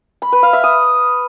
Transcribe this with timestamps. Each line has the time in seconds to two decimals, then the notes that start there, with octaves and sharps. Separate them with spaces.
0.22 B5
0.32 B4
0.43 F5
0.53 E5
0.64 D#6